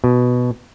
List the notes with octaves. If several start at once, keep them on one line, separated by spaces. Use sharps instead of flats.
B2